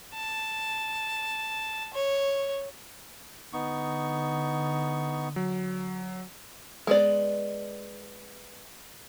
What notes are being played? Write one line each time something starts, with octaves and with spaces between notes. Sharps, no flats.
A5
C#5
D3 B3 D#4 C#6
F#3
G#3 B3 D5